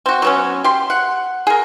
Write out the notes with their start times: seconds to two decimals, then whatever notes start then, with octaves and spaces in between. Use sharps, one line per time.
0.06 C4 F#4
0.22 F#3 B3 C#4
0.64 G4 C6
0.90 F#5
1.47 G#4 A#4